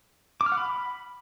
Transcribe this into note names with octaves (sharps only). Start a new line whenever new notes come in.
D6
F6
F#5
B5